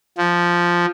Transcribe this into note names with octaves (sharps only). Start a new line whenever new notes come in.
F3